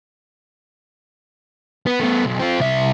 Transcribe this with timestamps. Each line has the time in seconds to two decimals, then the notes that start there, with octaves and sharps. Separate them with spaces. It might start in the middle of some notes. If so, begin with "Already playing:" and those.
1.86 B3
2.00 A3 B3
2.26 B1
2.39 C4 F4
2.60 C2 E5